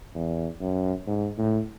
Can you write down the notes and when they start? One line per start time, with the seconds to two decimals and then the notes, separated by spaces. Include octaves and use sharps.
0.14 E2
0.61 F#2
1.07 G#2
1.38 A2